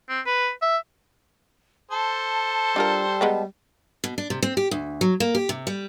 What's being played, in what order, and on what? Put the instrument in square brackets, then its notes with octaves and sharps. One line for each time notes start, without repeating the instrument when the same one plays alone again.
[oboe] C4
B4
E5
[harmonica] A4 C5 [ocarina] A5
[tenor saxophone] G3 [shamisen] D4 F4 A#4
[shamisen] G#3 B3 A#5
[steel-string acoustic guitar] B2
D4
C3
C4
G4
D2
F#3
A#3
G4
C3
G3